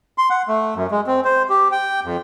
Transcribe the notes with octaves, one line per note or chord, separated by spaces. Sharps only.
C6
F#5
A3
F#2
G#3
C4
C5
G4
G5
F2